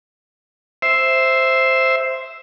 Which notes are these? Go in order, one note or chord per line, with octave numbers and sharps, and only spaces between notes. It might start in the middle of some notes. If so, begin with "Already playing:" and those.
C5 E5